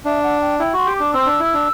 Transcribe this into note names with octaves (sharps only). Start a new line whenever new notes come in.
D4 E5
F#5
G5
E4 G5
F#4 C6
G4
D4 D6
C4 E6
D4
E4
D4